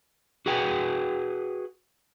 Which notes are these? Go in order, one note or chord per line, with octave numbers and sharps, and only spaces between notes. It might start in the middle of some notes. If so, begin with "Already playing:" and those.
F#4 G#4 B4 F#5 G5